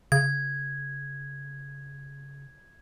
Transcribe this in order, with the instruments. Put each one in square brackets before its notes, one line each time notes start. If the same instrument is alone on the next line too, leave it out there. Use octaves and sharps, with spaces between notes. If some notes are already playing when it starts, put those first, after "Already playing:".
[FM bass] C#3 [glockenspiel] G#6